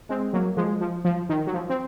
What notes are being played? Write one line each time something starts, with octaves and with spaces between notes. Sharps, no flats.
G#3 C4
F#3 A#3
F3 G#3
F3
F3
D#3
F#3
F3
C4